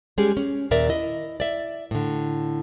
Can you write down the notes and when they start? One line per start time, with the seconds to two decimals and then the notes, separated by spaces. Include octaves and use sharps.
0.18 G3 G#3 C#4 G4 G#4
0.37 C#4
0.71 D#2 A#2 A#4 D5 E5
0.89 E4 D#5
1.40 D5 E5
1.91 A2 D3